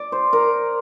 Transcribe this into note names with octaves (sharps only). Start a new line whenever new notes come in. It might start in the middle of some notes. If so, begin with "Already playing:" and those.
Already playing: D5
C5
A#4